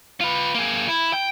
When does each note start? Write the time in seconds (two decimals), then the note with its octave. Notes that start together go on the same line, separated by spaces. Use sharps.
0.21 F4 B4
0.55 A#3 G#4
0.88 E4
1.13 G5